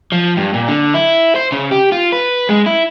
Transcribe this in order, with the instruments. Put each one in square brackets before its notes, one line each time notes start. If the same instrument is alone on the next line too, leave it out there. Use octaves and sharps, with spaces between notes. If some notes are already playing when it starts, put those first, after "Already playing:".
[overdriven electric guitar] F3
G2
A#2
D3
E4
C5
C#3
G4
F4
B4
G#3
E4